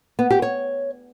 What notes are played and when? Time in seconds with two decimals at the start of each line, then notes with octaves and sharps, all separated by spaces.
0.19 B3
0.30 G4
0.42 C#5